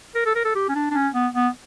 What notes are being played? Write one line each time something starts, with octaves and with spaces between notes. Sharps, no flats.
A#4
A4
A#4
A4
G4
C#4
D4
D4
C#4
B3
B3